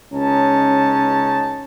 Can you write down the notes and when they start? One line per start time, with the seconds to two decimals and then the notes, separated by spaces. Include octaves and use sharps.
0.12 C#2 C#4 D#4 A5